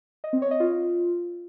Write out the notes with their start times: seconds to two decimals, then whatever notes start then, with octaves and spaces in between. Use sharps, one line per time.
0.24 D#5
0.33 C4
0.42 C#5
0.51 D#5
0.60 F4